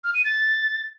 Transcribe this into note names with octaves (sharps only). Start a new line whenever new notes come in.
F6
D#7
A6